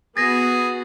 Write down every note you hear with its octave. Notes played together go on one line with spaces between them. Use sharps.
B3 F#4 G#4 A6 A#6